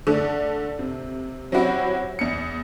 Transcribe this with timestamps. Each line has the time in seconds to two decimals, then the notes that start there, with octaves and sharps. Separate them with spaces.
0.07 D3 A3 A4
0.79 C3
1.52 F#3 C4 C#4 E4 F#4 G4
2.19 E2 C#7